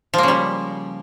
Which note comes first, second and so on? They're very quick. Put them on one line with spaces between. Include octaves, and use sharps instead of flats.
F3 A#3 C#3 G3